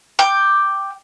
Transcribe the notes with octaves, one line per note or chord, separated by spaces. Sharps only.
G5 D6